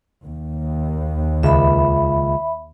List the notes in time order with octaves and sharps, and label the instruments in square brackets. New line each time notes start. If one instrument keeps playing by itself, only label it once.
[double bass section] D#2
[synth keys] C#2 [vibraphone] E5 B5